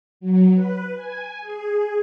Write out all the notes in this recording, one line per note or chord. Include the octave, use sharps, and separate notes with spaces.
F#3
B4
G#5
G#4